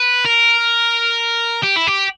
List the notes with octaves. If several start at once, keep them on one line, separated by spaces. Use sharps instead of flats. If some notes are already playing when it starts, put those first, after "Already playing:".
Already playing: B4
A#4
G4
E4
G4